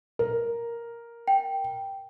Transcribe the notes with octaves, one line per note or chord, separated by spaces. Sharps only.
A#4
G5